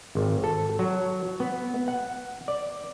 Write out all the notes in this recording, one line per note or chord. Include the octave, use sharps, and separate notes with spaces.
G#1
A4
F#3
B3
F#5
D5